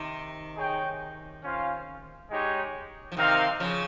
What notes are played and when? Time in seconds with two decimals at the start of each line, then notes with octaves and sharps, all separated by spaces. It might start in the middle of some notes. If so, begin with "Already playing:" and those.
Already playing: C3 D#3
0.56 D#4 G#4 C#5 G5
1.42 C#4 F4 C5 F5
2.30 G#3 D#4 G4 C#5
3.12 F3
3.16 C3 D#3 C4 D#4 A#4 F5
3.60 C#3 F3